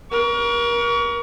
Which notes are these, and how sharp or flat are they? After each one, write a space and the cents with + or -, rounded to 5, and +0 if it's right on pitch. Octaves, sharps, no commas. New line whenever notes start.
A#4 +30 C#6 +35